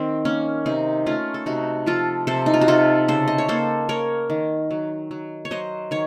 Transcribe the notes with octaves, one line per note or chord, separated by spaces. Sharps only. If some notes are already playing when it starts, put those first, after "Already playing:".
Already playing: D#3 C4
A#3 C#4
C3 C4 D#4
A3 C#4 F4
A4
C3 D#4 F#4
F3 F4 A4
C3 A4 C5
D#4
F4
F#4
C3 F4 A4
C#3 A4 C5
D#5
C#5
A#3 A4 C5
A#3 A#4 C#5
D#3
F#3
F#3
C#5
F#3 C5 D#5
D#3 C#5